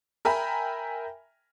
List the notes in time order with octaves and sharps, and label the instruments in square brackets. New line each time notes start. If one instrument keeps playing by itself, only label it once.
[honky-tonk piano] A#4 E5 G5 G#5 A#5 B5